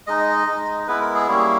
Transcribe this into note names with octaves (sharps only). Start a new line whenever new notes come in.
G#3 D#4 D#5
G#3 D#4
G#3 B3 E4 B4
A#4
G#4
G3 A#3 C#4 E4
G#4